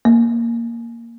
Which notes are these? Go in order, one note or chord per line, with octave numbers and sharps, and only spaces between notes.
A#3